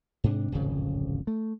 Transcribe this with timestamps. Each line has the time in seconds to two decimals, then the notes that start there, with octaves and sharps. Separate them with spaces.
0.24 G#2 C3 D4
0.52 D1 G#1 F2 C#3
1.27 A3